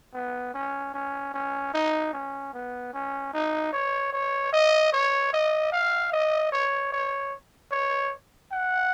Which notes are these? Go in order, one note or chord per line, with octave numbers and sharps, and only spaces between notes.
B3
C#4
C#4
C#4
D#4
C#4
B3
C#4
D#4
C#5
C#5
D#5
C#5
D#5
F5
D#5
C#5
C#5
C#5
F#5